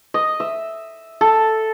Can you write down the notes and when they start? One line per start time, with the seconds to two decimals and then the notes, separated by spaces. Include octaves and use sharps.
0.14 D#5
0.40 E5
1.21 A4